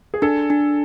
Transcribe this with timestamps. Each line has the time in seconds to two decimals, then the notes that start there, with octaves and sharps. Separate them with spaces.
0.14 G#4
0.22 D4 A4
0.50 D4